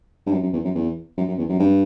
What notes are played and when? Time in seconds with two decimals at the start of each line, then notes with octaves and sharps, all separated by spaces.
0.27 G2
0.32 F#2
0.43 F#2
0.53 E2
0.64 F#2
0.75 E2
1.17 F#2
1.28 F#2
1.38 E2
1.50 F#2
1.60 G2